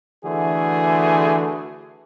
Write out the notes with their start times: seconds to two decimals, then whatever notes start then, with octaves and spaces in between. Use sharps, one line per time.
0.24 D3 E3 A3 F#4 G#4